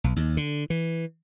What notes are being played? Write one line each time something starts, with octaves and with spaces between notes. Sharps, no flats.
B1
D#2
D3
E3